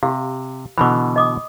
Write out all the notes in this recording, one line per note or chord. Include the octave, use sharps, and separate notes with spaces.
C3 G4 F5
B2 D3 E3 B5
D#5 D6 D#6